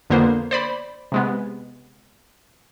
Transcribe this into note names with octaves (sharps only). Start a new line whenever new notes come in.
F2 D3 A#3 B3 C5
C5 D5 B5
C3 G#3 B3